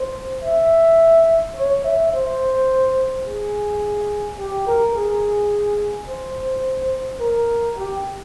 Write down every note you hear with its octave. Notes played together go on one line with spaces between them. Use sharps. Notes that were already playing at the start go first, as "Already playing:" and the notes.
Already playing: C5
E5
C#5
E5
C5
G#4
G4
A#4
G#4
C5
A#4
G4